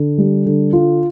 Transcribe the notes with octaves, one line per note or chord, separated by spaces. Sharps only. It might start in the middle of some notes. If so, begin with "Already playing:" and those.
Already playing: D3
G3
D3
F4